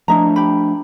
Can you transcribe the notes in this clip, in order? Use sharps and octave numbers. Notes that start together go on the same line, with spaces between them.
F3 A3 D4 E4 D#5 A#5
G4 B5